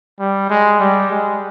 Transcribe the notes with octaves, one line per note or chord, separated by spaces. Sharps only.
G3
G#3
G3
G#3